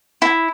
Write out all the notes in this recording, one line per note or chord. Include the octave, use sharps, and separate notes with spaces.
E4